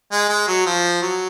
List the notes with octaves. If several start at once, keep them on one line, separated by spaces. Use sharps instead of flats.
G#3
G#3
F#3
F3
F#3